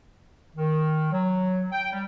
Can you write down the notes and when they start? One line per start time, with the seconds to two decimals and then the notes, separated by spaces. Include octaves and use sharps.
0.55 D#3
1.12 F#3
1.72 G5
1.93 G3